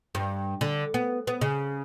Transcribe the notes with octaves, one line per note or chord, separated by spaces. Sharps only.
G2
D3
B3
B3
C#3